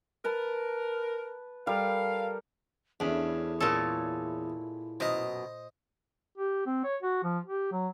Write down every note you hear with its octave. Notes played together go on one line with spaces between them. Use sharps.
A#4 B4 A5
G3 A4 A#4 F5
E2 A3 C#4 D4 E4
A#2 G#3 C#4 A4 C#5
F#2 B2 C5 D#5
G4
C4
C#5
F#4
F3
G4
F#3